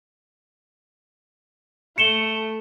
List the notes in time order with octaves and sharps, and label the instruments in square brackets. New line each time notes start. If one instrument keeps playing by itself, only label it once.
[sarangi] A3 [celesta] C#7 E7 G7